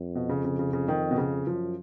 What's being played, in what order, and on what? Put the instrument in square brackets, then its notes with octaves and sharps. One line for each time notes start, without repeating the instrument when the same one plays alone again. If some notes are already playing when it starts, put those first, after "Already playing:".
Already playing: [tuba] F2
[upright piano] B2
C#3
C#3
C#3
C#3
D#3
B2
C#3
[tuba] F#2 [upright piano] F3